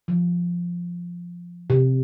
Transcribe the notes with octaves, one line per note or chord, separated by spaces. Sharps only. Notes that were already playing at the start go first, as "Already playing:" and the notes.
F3
C3